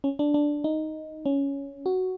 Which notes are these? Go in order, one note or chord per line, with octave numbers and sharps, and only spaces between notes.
C#4
D4
D4
D#4
C#4
F#4